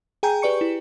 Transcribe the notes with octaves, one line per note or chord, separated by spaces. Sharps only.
G#4 G5 G#5 A#5 G6
G4 B4 D5 C#6 C#7
E4